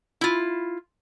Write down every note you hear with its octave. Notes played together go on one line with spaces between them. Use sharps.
E4 F4